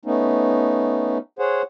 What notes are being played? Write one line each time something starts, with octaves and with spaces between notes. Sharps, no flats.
A3 B3 C#4 D#4
G#4 C5 C#5 F#5